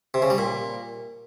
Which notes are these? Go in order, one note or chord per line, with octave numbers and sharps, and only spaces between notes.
C3
C#3
G3
A#2